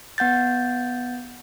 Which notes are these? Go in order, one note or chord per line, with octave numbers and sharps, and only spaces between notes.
B3 F#5 G6 A6